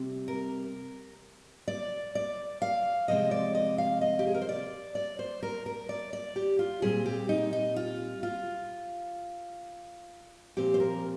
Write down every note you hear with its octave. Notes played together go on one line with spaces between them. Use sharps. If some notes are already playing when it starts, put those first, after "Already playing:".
Already playing: C3 G3 C4
A#4
D5
D5
F5
C3 F3 G#3 C4 D#5
D5
D#5
F5
D#5
G4
G#4
A#4
C5
D5
D5
C5
A#4
A#4
D5
D5
G4
F4
A#2 G3 C4 G#4
G4
D#4
D#4
F4
F4
A#2 F3 C4 G4
C5
A#4